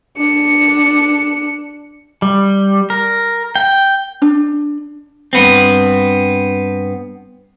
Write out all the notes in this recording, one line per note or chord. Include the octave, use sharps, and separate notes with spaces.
D4 C#7
G3
A#4
G5
D4
G2 B3 C4